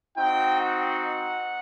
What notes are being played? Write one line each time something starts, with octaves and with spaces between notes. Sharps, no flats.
C4 D#4 F#4 G5
F#5